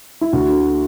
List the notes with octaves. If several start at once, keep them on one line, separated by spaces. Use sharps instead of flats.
E4
D2 F#4
D3